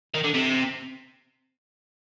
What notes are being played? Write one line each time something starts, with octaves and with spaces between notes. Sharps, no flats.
D#3
D3
C3